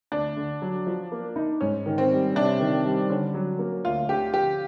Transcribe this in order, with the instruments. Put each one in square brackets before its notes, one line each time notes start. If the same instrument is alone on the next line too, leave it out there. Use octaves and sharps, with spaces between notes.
[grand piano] D2 [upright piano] D4
[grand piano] D3
F#3
F3
A#3
D#4
[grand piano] G#2 [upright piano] C#4
[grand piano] D#3
[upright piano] C4
[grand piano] G3
[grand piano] C3 [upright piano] D4
[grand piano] D#3
G3
[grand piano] D3 [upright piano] C#4
[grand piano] F#3
A#3
[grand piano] D2 [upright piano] F4
[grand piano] D3 [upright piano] G4
[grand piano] F3 [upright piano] G4